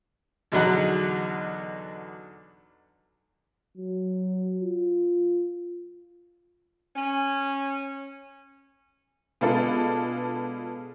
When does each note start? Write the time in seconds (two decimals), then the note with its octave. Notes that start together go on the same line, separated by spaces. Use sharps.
0.52 E2 B2 D3 F#3 D#4 F#5
3.77 F#3
4.61 F4
6.96 C#4
9.41 B2 G#3 B3 D4 F4 A4